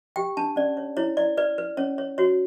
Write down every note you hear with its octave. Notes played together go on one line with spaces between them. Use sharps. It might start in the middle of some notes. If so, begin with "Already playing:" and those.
G4 G5
D4 A5
C#4 D5
C#5
E4 C#5
E4 D5
B4 D5
B4
C#4 C#5
C#5
F#4 C#5